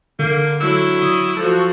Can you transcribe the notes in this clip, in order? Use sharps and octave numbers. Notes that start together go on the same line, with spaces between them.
D3 A#3
F#3 E4
D#6
F3 F#4 A4